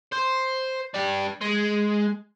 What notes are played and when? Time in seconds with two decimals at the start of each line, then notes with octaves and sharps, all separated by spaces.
0.12 C5
0.94 D4 G4
1.41 G#3